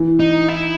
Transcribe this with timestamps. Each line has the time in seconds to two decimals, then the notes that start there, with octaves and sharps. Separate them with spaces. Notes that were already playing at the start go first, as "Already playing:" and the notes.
Already playing: E3
0.19 D#4
0.48 E4